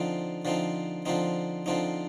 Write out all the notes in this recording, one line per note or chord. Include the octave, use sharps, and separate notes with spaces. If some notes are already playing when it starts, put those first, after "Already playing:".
Already playing: D3 F3 C4 D#4
D3 F3 C4 D#4
D3 F3 C4 D#4
D3 F3 C4 D#4